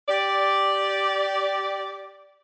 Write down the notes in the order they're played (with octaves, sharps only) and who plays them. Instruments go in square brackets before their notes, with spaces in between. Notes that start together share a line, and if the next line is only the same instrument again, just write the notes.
[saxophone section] G4 D5